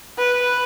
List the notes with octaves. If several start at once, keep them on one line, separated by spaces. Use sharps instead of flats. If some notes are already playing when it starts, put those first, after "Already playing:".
B4